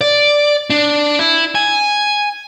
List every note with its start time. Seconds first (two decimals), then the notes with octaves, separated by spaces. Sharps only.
0.01 D5
0.70 D4
1.19 E4
1.55 G#5